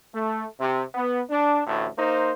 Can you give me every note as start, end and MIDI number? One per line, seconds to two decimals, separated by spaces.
0.14 0.44 57
0.60 0.82 48
0.94 1.21 59
1.30 1.62 62
1.67 1.87 33
1.67 1.87 38
1.67 1.87 45
1.98 2.32 58
1.98 2.32 63
1.98 2.32 72